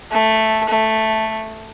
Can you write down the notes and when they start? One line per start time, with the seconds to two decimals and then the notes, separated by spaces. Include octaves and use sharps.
0.11 A3
0.69 A3